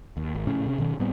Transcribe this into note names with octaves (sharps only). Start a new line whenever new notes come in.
D#2
G#1
A#1 A2 C#3 C#4
C3 C#4
B2 D#3 C#4
A2 G3 B3 C4